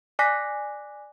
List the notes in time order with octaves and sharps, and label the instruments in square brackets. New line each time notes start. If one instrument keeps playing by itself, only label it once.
[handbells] D5 G#5 D6 F#6 A#6 B6